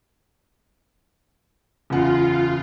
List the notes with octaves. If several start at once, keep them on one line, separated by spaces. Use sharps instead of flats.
F#1 E2 F4 F#5